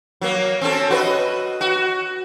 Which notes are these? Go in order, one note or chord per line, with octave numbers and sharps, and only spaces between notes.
F#3 A#3
C4 C#4 A4
F#4 B4 D#5
F#4